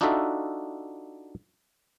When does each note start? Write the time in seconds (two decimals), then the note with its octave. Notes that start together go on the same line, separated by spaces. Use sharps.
0.01 D4 D#4 F4 F#4 A4 E5